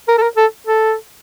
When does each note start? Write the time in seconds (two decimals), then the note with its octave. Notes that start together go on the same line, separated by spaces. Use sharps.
0.08 A#4
0.18 A4
0.23 A#4
0.37 A4
0.67 A4